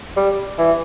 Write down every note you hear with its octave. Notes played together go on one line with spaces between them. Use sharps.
G3
E3